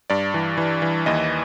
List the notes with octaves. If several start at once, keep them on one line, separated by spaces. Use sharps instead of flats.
G2 D5
E3
E3
E3
D#2 D#5